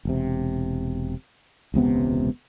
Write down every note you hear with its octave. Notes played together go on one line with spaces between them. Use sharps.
E1 C3
E1 C#2 C3 B3